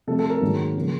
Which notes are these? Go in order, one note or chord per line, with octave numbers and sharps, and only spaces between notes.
C3 F3 A3 A4
A4
A#4
G#2 D#3 F#3 A#3
C#3 F3 A#3